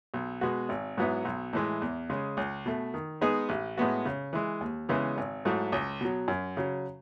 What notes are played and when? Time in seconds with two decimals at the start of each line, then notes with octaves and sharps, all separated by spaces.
0.14 B1
0.41 B2 G#3 B3 F#4
0.69 G#1
0.98 G#2 F#3 B3 E4
1.25 B1
1.53 A2 E3 G#3
1.82 E2
2.10 C#3 G#3
2.37 C#2
2.66 B2 A3
2.94 D#3
3.21 G#3 B3 D#4 G#4
3.49 A1
3.77 A2 G#3 B3 F#4
4.05 C#3
4.33 E3 G#3
4.61 D#2
4.89 C#3 E3 G#3 B3
5.17 G#1
5.45 G#2 F#3 A3 E4
5.72 C#2
6.01 B2 F#3
6.28 F#2
6.57 C#3 F#3